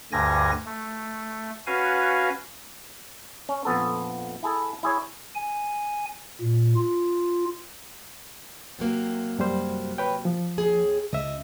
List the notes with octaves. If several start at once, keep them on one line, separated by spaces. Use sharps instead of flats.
D2 G2 D3 G#5 A#6
A3
C#4 F#4 B4 F5 G#5
C#4
A#1 F2 B3 A4
E4 G#4 A4
E4 G#4 C#5
G#5
A#2
F4
C3 F#3 A#3
F#2 G3 C5
B4 C#5 G5
F3
D#2 G#4
C#2 D#5 E5